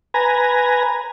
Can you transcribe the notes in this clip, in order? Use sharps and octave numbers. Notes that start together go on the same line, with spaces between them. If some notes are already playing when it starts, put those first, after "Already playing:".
B4 G#5 A#5